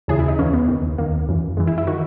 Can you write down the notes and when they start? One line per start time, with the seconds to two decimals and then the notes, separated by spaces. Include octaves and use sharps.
0.08 D#2 C#3 E3 G#4
0.19 E4
0.28 D#4
0.39 D#2 C#3 E3 C#4
0.53 B3
0.68 D#2 D#3
0.98 D#2 D#3 A#3
1.28 F#2 E3
1.57 F#2 E3 G#3
1.67 E4
1.78 E4
1.87 D#3 F#4